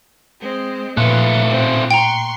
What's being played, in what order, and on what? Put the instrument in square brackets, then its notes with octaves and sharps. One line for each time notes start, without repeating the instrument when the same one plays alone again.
[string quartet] G#3 C4
[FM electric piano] A#2 F#6 [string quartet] F3 B4 C#5 [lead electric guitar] A3 F4
[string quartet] A2 C4
[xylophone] G5 A#5 [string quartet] C6 C#6